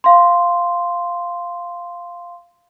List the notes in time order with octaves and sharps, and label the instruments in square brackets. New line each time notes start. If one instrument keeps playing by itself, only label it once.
[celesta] F5 C6